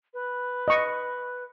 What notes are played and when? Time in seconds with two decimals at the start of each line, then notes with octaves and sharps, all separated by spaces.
0.14 B4
0.68 D#5 C#6